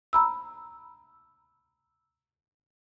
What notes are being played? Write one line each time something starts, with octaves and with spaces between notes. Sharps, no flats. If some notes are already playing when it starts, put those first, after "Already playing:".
A#5 B5 E6